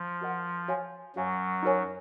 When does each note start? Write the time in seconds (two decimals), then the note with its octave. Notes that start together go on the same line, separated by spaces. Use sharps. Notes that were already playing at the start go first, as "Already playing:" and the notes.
Already playing: F3
0.21 F#4 A#4 D#5 F#5
0.68 F#4 C#5 F5 G#5
1.16 F#2 F#3 F#4 C#5 F5 G#5
1.63 D#4 F#4 A#4 C#5 G#5